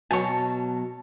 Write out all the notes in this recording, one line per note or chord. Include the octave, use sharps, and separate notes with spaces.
B2 F#3 F#4 C#5 A5